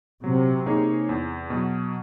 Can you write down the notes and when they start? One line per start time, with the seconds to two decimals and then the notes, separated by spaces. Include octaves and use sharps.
0.24 C3 F#3
0.66 A#3 D#4 G#4 C#5
1.09 E2
1.50 B2 F#3